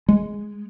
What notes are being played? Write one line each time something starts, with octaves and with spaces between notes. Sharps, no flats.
G#3